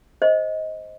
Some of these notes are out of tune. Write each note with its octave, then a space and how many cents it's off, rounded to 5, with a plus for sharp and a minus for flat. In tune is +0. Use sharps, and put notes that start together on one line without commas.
C5 +0 D#5 +15